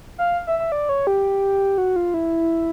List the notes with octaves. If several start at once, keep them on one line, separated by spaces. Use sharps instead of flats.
F5
E5
E5
D5
C#5
G4
F#4
F4
E4